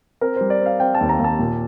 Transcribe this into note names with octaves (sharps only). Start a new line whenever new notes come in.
C4 A#4
G3 C5
D5
C4 F5
C4 G5
A5
D#2
A#5
D#2 A5
A#2